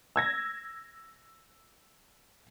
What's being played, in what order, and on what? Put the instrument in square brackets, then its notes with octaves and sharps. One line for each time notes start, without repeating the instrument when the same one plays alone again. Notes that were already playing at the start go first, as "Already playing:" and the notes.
[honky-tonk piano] E6 G#6 A#6